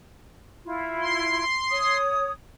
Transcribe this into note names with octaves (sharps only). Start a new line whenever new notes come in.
E4 F4
C6
C#5 D#6